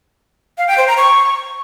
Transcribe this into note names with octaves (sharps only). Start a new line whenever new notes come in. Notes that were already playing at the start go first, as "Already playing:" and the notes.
F5
G5
C5
A#5
C#6